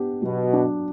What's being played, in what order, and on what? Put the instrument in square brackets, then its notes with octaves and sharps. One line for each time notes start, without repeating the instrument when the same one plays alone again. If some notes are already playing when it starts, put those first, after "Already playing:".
Already playing: [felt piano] B3 D4 G4
[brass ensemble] B2 [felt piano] F#3
[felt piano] D4